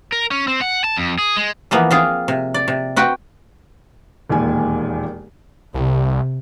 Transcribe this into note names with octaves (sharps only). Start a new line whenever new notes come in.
A#4
C#4
C4
F#5
A5
F2
G#4
G#3
E3 F3 A#3 B3
C4 F4 G#4
C3
D5
C3
C4 F#4 B4 G5
E1 D#2 A#2 G#5
C2 C3